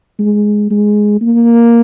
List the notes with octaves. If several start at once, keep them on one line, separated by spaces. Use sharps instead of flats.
G#3
G#3
A#3